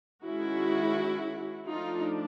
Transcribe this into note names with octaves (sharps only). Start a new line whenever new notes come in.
D#3 G#3 C#4 E4 F#4
F3 A3 D4 D#4 F4